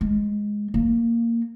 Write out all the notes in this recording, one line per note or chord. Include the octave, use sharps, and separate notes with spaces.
G#3
A#3